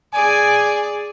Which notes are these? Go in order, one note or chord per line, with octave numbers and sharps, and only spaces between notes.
G#4 D5 G#5